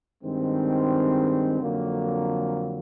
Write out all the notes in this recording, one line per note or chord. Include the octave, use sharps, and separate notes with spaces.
G2 D#3 G#3 C4
F2 D3 F#3 A#3